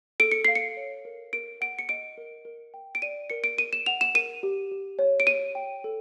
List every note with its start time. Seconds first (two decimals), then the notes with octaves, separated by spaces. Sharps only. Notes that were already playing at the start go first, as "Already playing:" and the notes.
0.20 A4 D7
0.32 C#7
0.45 F5 C7
0.55 C#7
0.77 C#5
1.05 A#4
1.33 A#4 D7
1.61 F#5 D7
1.79 C#7
1.89 D#5 D7
2.18 A#4
2.45 A#4
2.74 G5
2.95 D7
3.02 D5 D#7
3.30 A#4 C#7
3.44 D7
3.58 A#4 D#7
3.73 E7
3.86 F#5 F7
4.01 E7
4.15 A#4 D#7
4.43 G4
4.72 G4
4.99 C#5
5.20 D7
5.27 C#5 D#7
5.55 G5
5.84 A4